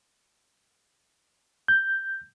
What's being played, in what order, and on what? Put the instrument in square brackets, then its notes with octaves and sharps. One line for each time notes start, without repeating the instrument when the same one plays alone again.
[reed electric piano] G6